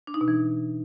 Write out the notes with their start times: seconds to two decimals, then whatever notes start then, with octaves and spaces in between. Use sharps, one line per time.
0.07 D4
0.14 D#4
0.21 B2
0.28 E3